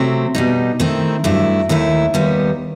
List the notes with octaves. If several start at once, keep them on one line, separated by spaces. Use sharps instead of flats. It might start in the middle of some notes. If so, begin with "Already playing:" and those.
Already playing: C3 F#3 A3 C4
B2 G3 D#4
D#3 A3 C4 E4
G2 F#3 A3 E4
D#2 D#3 A3 E4
D#2 D#3 G3 B3